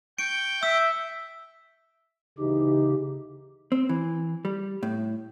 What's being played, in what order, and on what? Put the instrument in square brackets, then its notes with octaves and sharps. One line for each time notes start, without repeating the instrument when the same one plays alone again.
[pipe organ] G5 C#6 G6 [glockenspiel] D7
[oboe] E5 [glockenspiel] E6
[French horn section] D2 E3 D#4 [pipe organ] C#3 G4
[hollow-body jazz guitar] C4
E3
G3
A2